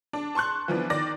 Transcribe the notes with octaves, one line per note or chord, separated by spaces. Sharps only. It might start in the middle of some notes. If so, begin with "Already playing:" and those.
D4
A5 C6 C#6 F#6
E3 F3 B3 D4
D#3 D5 A#6